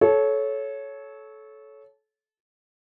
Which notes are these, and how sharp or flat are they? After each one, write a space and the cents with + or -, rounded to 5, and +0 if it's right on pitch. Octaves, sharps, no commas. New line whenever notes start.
A4 -25 C#5 +0